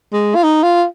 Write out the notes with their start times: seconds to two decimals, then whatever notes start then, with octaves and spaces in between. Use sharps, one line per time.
0.13 G#3
0.35 F4
0.43 D#4
0.63 F4